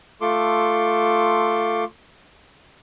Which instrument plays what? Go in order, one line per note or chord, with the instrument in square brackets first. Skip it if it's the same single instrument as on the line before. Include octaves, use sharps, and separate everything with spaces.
[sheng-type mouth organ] A3 F4 A4 C6 D6